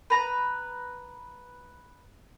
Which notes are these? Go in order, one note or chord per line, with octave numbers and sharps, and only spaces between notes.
B4 A#5